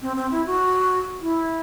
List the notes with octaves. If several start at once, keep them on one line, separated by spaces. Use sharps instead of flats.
C4
C4
E4
F#4
E4